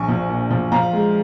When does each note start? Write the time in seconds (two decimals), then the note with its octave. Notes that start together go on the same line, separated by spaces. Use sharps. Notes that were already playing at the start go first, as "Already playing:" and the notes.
Already playing: A#1 G#5 C#6
0.08 F3
0.29 A#2
0.51 F3
0.72 F3 F5 A#5
0.93 G#3